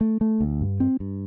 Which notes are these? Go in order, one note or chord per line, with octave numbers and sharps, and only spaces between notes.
A3
A3
D2
G2
C4
G2